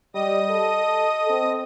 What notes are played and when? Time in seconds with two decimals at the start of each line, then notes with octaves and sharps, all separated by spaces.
0.15 G3 D#5 D#6
0.50 A4
1.30 C4